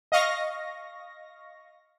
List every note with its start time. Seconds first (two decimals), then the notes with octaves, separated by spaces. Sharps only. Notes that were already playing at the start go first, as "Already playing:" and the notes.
0.12 D#5 F5 C#6 A#6